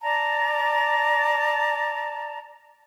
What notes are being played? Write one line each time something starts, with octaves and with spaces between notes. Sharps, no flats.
D5 A5 A#5